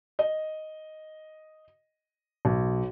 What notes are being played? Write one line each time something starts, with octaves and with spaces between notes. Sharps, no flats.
D#5
B1